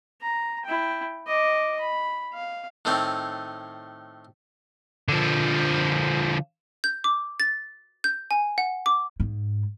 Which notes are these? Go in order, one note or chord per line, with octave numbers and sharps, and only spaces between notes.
A#5
E4 G5
D#5 D6
B5
F5
A2 D#3 A3 C4 C#4
D3 F3
G6
D6
A6
G6
G#5
F#5
D6
G#2